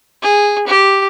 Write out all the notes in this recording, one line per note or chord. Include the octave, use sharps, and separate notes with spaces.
G#4
G4